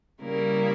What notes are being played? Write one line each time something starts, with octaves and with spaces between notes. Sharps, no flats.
C#3 G3 A#3 E4 A#4